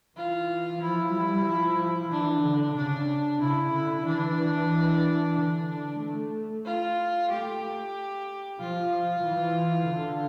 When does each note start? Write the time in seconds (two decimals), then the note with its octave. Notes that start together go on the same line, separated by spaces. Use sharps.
0.16 E3 F4
0.81 F3 E4
1.14 G3
1.46 F3
2.11 E3 D4
2.43 D3
2.76 C#3 D4
3.41 C#3 E4
3.73 D3
4.05 E3 D4
5.36 D3 D4
6.01 A3
6.65 F4
7.30 A3 G4
8.60 F3 F4
9.25 E3
9.89 D3